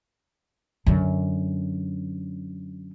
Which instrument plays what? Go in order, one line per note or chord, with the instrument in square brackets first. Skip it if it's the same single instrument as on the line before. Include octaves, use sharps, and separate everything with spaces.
[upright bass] F#2 D3